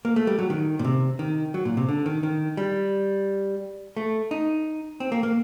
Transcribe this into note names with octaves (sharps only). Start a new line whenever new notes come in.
A#3
A3
G3
F#3
D#3
A#2
C3
D#3
F#3
A#2
C3
D3
D#3
D#3
G3
A3
D#4
C4
A#3
A#3